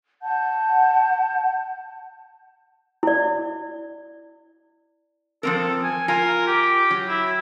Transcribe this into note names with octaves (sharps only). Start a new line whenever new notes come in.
F#5 A5 G6
E4 D5
F3 C4 A4 A#4
G#5
F4 A#4 G#5
G4
F#3
E4